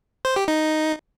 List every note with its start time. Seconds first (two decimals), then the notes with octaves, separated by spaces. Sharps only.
0.25 C5
0.36 G4
0.48 D#4